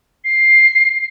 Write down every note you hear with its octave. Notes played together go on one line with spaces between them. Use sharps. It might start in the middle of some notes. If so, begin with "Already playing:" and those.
C7